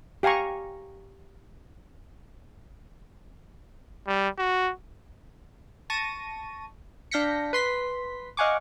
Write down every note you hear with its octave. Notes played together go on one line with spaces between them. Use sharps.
G4 F5 G#5 A#5 C#6
G3
F#4
A5 C#6 A#6 D#7
D4 F5 G6 A#6 B6 C#7
B4 C6 B6
D#5 F5 F#5 G#5 C#6 D6